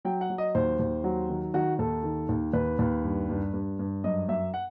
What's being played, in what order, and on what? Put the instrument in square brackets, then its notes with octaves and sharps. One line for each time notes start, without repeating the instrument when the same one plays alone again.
[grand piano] F#3 G5
F#5
F#3
D#5
D#2 C5
D#2
F#3
D#3
D#3 F#4
D#2 A4
D#3
D#2
D#2 B4
D#2
G2
G2
G2
G2
F#2 D#5
F#2 E5
F#5